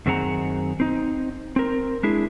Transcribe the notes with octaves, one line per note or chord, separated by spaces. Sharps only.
F#2 D#3 C4 G#4 F#5 A#5
C4 D#4
C4 A#4
G#3 D4 E4 G#4